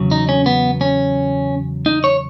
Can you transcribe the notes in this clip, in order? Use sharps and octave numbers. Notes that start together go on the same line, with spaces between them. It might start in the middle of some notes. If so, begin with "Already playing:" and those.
Already playing: E2 C#3 F#3
D#4
C#4
B3
C#4
D#4
C#5